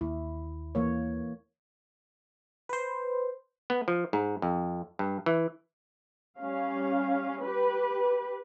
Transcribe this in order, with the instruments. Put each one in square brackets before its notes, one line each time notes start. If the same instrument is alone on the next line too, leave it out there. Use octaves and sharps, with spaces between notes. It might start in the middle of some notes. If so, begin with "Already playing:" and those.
[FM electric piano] D#2 [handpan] E4
[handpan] E3 A#3 C#5
[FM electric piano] B4 C5
[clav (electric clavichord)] B3
F3
G#2
F2
G2
E3
[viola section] G3 C#4 F5
G4 B4